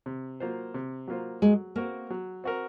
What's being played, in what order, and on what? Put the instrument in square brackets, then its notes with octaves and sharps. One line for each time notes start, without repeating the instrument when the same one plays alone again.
[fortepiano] C3
F#3 A#3 F4 C5
C3
F#3 A#3 F4 C5
[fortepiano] F#3 [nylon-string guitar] G#3
[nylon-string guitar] A#3 [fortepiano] C4 F#4 A#4
[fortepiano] F#3
C4 F#4 A#4